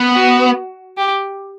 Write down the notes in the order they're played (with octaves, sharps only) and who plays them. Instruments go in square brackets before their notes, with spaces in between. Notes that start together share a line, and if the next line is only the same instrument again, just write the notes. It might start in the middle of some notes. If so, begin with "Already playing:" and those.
Already playing: [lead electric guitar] B3
[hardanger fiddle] F#4
G4